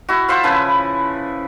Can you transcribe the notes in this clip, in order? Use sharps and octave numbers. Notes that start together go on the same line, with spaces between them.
E4 F#4
F4 C5 E5 F#5
C#3 F3 E4 B4